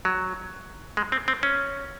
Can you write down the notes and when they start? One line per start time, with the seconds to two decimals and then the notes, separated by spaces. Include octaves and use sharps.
0.05 F#3
0.97 G#3
1.12 C4
1.28 C4
1.43 C#4